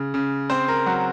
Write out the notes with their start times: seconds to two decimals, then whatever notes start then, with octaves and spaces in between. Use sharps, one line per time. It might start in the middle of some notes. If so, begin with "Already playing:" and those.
Already playing: C#3
0.14 C#3
0.50 C4 C5
0.68 A#4
0.86 F#3 F#4